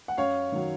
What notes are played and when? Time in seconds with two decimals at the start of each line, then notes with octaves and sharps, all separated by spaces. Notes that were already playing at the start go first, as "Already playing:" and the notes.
0.08 F#5
0.18 F#2 C#5 F5
0.52 D#3 F#3